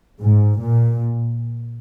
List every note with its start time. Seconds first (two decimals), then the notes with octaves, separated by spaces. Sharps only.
0.21 G#2
0.59 A#2